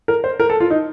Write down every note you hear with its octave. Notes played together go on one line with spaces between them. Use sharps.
A#4
C5
A#4
A4
F4
D#4